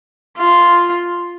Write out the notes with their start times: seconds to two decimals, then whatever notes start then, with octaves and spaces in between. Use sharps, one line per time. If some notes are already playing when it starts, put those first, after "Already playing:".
0.38 F4